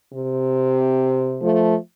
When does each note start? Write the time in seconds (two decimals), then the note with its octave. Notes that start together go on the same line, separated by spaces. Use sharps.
0.13 C3
1.41 F3 A3